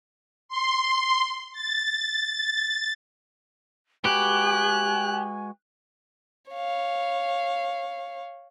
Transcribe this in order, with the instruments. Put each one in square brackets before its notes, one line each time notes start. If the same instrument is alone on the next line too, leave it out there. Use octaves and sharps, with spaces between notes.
[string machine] C6
A6
[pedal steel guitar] G#3 F#4 B4 [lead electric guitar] G4 [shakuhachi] G#5 [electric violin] F#6
[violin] C#5 F5